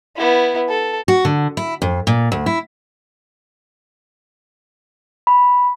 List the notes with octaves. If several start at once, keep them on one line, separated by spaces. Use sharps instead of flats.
B3 E4
A4
F#4
D3
E4
F2
A#2
D2
E4
B5